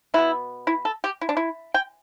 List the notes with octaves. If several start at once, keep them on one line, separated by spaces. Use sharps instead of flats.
B2 B3 E4
E4
A4
G4
E4
D4
E4
G5